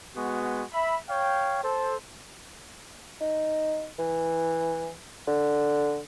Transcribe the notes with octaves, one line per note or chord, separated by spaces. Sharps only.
G#3 B3 F#4
E5 B5
C#5 F5 G5
A4 C5
D#4
E3
D3